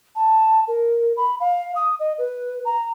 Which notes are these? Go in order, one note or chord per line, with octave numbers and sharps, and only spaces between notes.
A5
A#4
B5
F5
D#6
D#5
B4
A#5